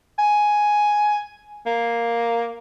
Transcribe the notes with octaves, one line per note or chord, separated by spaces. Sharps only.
G#5
A#3